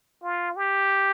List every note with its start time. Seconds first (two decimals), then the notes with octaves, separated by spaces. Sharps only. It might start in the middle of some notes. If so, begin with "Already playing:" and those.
0.23 F4
0.56 G4